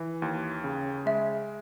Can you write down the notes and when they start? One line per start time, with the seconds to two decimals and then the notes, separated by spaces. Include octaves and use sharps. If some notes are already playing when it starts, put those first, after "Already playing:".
Already playing: E3
0.22 D#2
0.64 C#3
1.06 G#3 E5